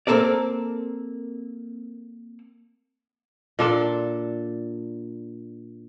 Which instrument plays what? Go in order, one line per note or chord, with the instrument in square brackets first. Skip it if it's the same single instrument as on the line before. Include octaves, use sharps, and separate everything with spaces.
[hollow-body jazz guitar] A#3 C4 A4 A#4 D5
[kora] A#2 D4 A4